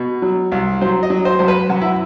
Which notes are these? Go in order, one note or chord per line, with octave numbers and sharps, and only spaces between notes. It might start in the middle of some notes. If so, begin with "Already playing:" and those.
Already playing: B2
F#3
C2
F#3 C5
D#5
F#3
C5
F#2 C5
B4
F#2 F#4
E4